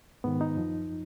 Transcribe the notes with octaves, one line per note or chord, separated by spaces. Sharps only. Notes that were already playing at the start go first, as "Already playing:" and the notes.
G#2 D#3 B3
D#4
F#2 F3